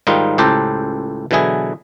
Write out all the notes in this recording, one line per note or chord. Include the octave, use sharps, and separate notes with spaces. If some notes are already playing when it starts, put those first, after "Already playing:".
G#2 D#3 G3 D#4 F4
C#2 A2 G4 A4 C5 A#5
B2 D3 E3 F#3 E4 G#4